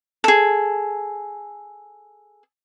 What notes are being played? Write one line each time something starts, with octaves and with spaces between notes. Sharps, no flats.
G#4 A4